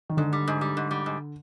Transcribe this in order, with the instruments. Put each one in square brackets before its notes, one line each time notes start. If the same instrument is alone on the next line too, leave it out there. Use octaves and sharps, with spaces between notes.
[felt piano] D#3
[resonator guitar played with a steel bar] G#2 [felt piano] D3
[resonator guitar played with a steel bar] G3
G#2
G3
G#2
G3
G#2